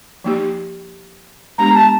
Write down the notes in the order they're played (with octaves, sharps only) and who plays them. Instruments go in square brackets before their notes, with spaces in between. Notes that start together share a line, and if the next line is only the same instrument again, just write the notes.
[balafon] F3 A#3 D#4 G4
[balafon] G#3 B3 D4 G4 [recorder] A#5
[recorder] A5